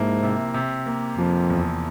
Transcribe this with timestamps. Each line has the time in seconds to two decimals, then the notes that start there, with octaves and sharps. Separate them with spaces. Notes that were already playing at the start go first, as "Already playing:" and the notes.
Already playing: G#2 F3 A#3 E4
0.23 C3
0.54 C3
0.86 A#3
1.18 F2 F3
1.50 E2